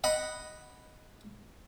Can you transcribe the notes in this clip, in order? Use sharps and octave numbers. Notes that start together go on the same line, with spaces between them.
D#5 F#5 B5